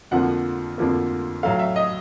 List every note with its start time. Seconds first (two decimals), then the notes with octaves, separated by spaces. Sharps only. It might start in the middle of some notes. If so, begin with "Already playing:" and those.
0.11 F2 D3 F3 A#3 F#5
0.78 F2 D3 F3 A#3
1.43 A2 F#3 A3 F5
1.59 E5
1.76 D#5